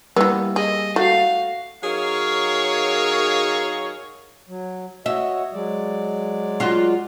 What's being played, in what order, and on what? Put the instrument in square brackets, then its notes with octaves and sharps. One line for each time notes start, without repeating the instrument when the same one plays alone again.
[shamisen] E3 B3 [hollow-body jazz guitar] G3 A#3 [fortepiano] E6
[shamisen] G#4 [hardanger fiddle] D#5
[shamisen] A3 [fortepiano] F#4 [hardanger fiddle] F5
[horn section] F#3 D#4 G#4 A#4 C#5 F5
[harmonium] F#3
[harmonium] F#4 C#5 D#5 [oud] E5
[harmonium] F#3 G#3 D5
[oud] F4 F#4